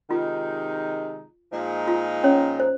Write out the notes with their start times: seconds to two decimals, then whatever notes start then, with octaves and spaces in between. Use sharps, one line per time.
0.10 C3 D#3 G#3 D#4 F4
1.53 A#2 F3 G#3 D#4
1.88 F4
2.24 C#4 C#5
2.60 C5